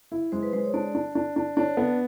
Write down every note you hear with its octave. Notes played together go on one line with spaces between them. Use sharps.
E4
G#3 C5
B4
G#3 C5
C#5
D4 D5
D4
D4
D4
D4 C#5
B3